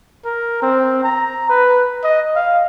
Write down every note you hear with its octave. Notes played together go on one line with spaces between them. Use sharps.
A#4
C4
A#5
B4
D#5
F5